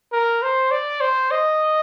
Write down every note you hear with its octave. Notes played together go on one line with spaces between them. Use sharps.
A#4
C5
D5
C5
D#5